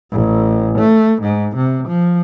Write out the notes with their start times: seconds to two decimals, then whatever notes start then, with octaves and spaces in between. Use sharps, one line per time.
0.12 A1
0.78 A3
1.22 G#2
1.56 C3
1.88 F3